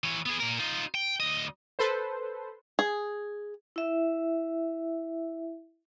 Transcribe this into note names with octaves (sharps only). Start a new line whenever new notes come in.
E3 C#5
B3 G#4
A#2 A#4
D#4 F4
G5
D2 D#5
A4 B4 C5
G#4
E4 E5